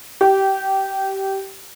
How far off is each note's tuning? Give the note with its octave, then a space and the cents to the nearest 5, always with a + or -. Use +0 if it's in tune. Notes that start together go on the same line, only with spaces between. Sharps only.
G4 -20